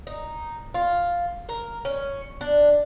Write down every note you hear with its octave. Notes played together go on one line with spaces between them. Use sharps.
D#4
F4
A#4
C#4
D4